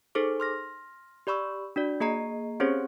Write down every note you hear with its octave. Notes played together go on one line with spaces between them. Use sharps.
D#4 G#4 A4 C5 D6
C6 F6 A#6
G4 D5 B5 C#6 E6
D4 F#4 D5
A#3 G#4 D#5 A#5 C7
C4 C#4 G4 G#4 C5 C#5